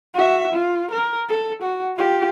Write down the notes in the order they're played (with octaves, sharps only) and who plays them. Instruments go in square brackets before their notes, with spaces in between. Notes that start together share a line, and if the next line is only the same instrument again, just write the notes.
[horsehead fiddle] F#4 E5
F4
A#4
A4
F#4
F4 G4